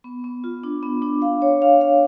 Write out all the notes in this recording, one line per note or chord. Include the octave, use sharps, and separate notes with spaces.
B3
B3
F4
D4
B3
D4
F5
C#5
F5
F5